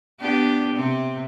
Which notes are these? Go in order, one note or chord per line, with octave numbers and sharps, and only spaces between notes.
B3 D4 G4
C3 C4